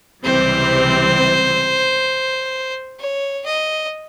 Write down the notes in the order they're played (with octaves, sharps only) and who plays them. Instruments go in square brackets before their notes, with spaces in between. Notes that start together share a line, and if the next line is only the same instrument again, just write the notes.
[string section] C#2 C3 E3 G3 C4 [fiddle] C5
[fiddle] C#5
D#5